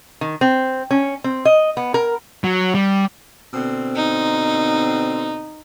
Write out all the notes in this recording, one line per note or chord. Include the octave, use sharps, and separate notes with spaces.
D#3
C4
C#4
C4
D#5
B3
A#4
F#3
G3
B2 D3 C4
D#4